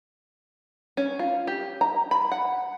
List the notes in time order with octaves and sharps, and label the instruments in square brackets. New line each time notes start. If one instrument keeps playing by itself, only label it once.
[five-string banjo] C#4
F4
G4
A#5
B5
F#5